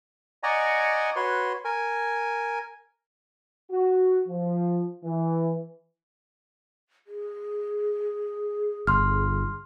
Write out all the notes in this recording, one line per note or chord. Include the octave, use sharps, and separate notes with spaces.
D5 D#5 F#5 G#5 A#5 C#6
F#4 B4 C#5 C6
A#4 G#5
F#4
F3
E3
G#4
G1 C6 F6